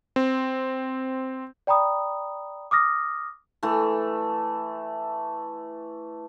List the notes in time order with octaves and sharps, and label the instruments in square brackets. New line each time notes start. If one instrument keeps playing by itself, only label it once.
[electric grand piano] C4
[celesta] D5 G5 A#5 B5 D#6
D6 D#6 F6 A#6
[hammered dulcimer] E3 A3